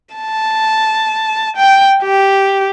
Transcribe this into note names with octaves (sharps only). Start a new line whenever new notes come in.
A5
G5
G4